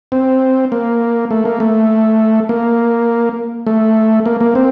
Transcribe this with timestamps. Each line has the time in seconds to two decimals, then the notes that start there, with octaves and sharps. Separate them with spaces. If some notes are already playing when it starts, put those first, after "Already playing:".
0.12 C4
0.72 A#3
1.31 A3
1.45 A#3
1.60 A3
2.49 A#3
3.67 A3
4.26 A#3
4.41 A#3
4.55 C4